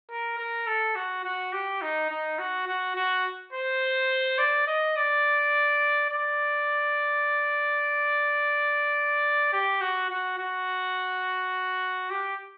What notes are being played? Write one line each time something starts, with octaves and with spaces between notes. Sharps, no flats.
A#4
A#4
A4
F#4
F#4
G4
D#4
D#4
F#4
F#4
F#4
C5
D5
D#5
D5
D5
G4
F#4
F#4
F#4
G4